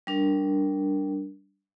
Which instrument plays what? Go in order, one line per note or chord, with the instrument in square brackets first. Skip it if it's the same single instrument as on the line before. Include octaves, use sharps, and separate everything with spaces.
[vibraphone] G3 D4 A#4